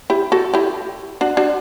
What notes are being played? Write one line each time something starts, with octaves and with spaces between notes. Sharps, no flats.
E4 G4
F#4 A4
E4 G4
D4 F#4
D4 F#4